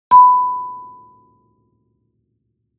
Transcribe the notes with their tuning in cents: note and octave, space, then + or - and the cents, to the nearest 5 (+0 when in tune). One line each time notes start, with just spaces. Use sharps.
B5 +15